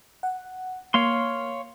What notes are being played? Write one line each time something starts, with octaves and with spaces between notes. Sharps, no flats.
F#5
A#3 C#5 F5 C6